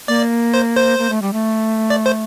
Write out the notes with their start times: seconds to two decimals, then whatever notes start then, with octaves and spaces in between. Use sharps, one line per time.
0.08 A#3 D5
0.54 C5
0.76 C5
0.99 A#3
1.10 A3
1.22 G3
1.33 A3
1.90 D5
2.06 C5